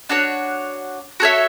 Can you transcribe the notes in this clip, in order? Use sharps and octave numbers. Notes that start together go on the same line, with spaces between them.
D4 F#4 C#5
F#4 A4 C#5 E5